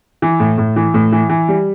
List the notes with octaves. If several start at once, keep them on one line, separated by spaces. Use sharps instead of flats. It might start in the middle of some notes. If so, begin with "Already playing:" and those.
E3
A2
A2
E3
A2
E3
E3
G3